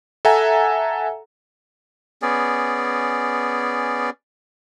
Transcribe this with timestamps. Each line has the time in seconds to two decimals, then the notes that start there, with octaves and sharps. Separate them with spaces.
0.25 A4 E5 F#5 G#5 A#5
2.22 B3 C#4 G#4 D5